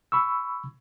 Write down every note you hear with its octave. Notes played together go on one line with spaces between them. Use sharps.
B5 C#6 E6